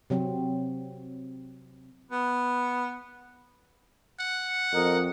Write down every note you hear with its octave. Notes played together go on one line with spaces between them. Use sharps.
C3 F#3 C4
B3
F#5
F2 A#4 D#5